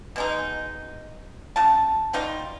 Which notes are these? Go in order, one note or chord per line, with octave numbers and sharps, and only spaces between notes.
B2 G#3 D#4
C#3 F4 A5
F#3 G3 D#4 F4